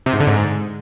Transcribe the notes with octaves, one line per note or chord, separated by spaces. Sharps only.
C3
G#2
D3
G#2